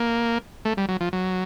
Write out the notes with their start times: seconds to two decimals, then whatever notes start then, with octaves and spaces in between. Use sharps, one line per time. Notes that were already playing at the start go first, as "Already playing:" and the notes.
Already playing: A#3
0.65 A3
0.77 G3
0.89 F#3
1.01 F3
1.13 F#3